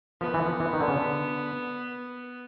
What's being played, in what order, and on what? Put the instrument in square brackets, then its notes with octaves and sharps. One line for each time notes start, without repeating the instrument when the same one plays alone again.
[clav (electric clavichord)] F3 [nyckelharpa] B3
[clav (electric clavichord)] E3
F3
E3
D#3
D3
C#3
D3